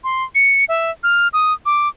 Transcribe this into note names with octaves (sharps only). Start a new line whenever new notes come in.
C6
C#7
E5
F6
D#6
D6